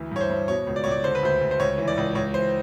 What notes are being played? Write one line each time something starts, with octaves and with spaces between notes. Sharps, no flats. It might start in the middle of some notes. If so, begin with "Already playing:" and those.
Already playing: D2 E3
G2 C#5
C5
G2
B2 C#5
C#2
D5
C#2 C#5
D5
D3 C5
B4
D2 C5
D2
C5
C#2 C#5
E3
D5
C#2
C#2 C#5
E3 C5